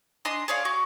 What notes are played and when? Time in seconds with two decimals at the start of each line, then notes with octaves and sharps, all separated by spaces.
0.25 D4 D#5 G#5 C6
0.48 G#4 C#5 D5 F5
0.65 F#4